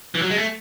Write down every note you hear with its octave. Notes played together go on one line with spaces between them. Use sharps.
E3
F#3
G#3
A3